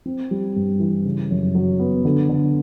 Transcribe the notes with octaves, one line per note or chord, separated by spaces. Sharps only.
C4
G3
G2
E3
C#3
F#2
F#3
B3
D3
D3